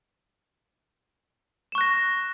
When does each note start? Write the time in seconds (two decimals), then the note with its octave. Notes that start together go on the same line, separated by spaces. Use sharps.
1.72 E7
1.75 C#6
1.78 F#6
1.81 A#6